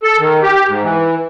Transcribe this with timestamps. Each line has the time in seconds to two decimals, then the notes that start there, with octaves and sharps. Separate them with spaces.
0.03 A4
0.19 D#3
0.42 G4
0.67 G#2
0.83 E3